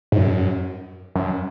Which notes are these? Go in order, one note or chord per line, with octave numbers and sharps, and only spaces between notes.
G#2
F#2
F#2